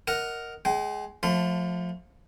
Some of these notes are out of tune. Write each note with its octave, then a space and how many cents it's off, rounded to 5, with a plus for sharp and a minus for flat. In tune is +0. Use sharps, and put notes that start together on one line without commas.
A#4 +0 D#5 +0 F#5 +0
G#3 +10 G5 -40
F3 +25 A3 +0 C6 -40